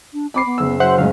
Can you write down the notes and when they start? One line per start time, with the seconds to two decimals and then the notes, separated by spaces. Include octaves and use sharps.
0.13 D4
0.34 C4 B5 D6 C7
0.46 B3
0.58 F#1 E6
0.80 F#3 C5 E5 F#5
0.98 F#1 A2 G#3 F5